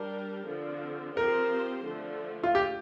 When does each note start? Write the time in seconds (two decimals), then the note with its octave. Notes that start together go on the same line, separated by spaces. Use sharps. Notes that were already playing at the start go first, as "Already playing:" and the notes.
Already playing: G3 D4 G4 A#4
0.47 D3 F3 C4
1.16 F3 C4 G4 A#4 C5
1.85 D3 F3 A3
2.43 F4
2.55 G4